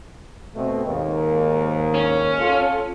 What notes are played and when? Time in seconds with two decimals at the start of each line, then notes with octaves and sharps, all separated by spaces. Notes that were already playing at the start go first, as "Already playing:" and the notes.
0.55 B2 A3 C4
0.86 D#2 G#2 A#3
1.94 C#4
2.40 F4 A4